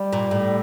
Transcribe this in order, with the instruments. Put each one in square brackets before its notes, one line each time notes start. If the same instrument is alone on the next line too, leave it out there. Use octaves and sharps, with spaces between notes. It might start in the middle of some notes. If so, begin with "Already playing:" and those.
Already playing: [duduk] G3
[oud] A#2
A2